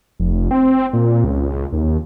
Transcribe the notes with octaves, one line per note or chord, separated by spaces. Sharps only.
F1
C4
A#2
C#2
D#2